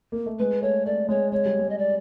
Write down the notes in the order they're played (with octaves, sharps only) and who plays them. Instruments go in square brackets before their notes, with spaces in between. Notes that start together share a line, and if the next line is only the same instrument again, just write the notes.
[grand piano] A#3
A3
[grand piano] G#3 [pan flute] B4
[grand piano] A3 [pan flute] C#5
[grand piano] A3 [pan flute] D5
[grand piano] G#3 [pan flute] C#5
[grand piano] G#3 [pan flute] C#5
[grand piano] G3
G#3
[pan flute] D#5
D5